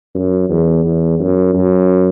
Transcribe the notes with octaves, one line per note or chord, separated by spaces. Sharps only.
F#2
E2
E2
F#2
F#2